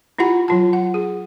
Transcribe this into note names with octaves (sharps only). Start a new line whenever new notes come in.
E4 F4 G4 F#5 B5
F#3 F4 A5
F#5
G#4